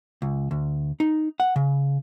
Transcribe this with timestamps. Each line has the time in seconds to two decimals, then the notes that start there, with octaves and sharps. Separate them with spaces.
0.22 C#2
0.51 D2
1.00 D#4
1.40 F#5
1.56 C#3